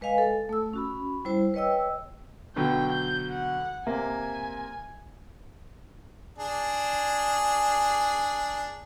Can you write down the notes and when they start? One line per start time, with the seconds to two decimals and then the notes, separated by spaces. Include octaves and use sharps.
0.01 G#3 B4 D#5 F5 G#5
0.18 A4
0.49 A3 E6
0.73 C#4 F#4 B5
1.25 G3 E4 C5
1.54 B4 C#5 D#5 G5 E6
2.56 B2 D3 F#3 G5
2.92 G6
3.31 F#5
3.87 C3 A#3 G#5
6.38 D4 G#4